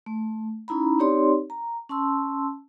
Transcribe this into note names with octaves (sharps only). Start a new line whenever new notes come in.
A3
C#4 D#4 E4 A#5 B5
C4 D#4 G4 C#5 D5 C6
A#5
C#4 A5 C6 E6